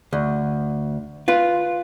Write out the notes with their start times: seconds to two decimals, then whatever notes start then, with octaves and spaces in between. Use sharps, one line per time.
0.13 D2
1.28 F4 B4